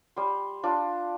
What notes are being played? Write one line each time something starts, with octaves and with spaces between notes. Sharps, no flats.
G3 C6
D4 F4